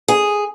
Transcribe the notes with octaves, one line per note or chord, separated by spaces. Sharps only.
G#4